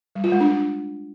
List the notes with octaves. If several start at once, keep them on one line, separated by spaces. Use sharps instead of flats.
G3
F4
G#3
D4